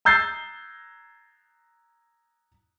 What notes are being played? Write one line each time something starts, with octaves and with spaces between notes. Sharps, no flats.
A#5 E6 G6 A6 C7